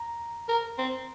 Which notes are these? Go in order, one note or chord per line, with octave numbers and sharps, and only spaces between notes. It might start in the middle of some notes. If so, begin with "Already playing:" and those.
Already playing: A#5
A#4
C4